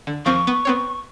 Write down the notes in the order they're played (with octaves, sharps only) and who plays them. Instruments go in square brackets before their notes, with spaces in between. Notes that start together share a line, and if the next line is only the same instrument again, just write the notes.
[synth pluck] D3
[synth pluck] D#2 F3 C4 [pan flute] C#6
[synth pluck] B3
B3 C4 C#5